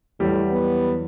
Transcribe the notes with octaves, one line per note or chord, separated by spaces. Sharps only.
E2 A2 F#3 G3
B3